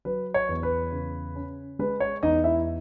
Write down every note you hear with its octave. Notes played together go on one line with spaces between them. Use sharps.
F#3 B4
C#5
E2
B4
C#3
C#4
G#3 B4
C#5
E2 D#4 D#5
E4 E5